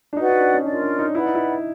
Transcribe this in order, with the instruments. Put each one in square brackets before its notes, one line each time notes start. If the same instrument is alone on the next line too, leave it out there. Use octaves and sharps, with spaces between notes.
[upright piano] D4
[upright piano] D#4 [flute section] F#4 B4 D5 F#5
[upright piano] D#4
D4
C#4
[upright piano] D4 [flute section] F4 A#4 D5
[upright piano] D4
D#4
[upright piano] E4 [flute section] B4 D5 F#5 B5
[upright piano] D#4
E4